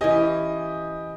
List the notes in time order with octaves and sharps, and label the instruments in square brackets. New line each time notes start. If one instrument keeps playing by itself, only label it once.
[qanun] E3 C#4 [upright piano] G4 D#5 G#5